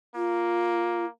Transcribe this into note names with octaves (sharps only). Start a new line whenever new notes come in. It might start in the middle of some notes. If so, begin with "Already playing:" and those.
A#3 F4